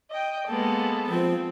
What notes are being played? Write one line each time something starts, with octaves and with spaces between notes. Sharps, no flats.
D#5 G5
G#3 A#3 B3 A4
F3 C4